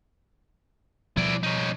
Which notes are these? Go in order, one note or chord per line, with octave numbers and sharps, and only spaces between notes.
B2 F3 G3 E4 D5
C#4 D#4